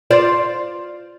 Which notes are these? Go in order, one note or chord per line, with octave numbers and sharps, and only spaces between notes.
F4 C5 D5